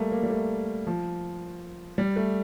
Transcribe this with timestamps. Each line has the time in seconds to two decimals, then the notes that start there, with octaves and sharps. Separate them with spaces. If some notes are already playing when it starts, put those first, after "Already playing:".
Already playing: G3 A3 A#3
0.12 A#3
0.23 G3
0.30 A3
0.87 F3
1.98 G3
2.16 A3